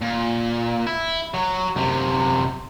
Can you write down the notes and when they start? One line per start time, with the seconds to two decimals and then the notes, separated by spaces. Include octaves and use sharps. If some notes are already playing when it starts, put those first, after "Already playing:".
0.01 A#2
0.87 E4
1.34 F#3 C#5
1.76 F#2 C3